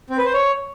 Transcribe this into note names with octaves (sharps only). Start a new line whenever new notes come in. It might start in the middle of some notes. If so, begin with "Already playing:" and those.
C4
B4
C5
C#5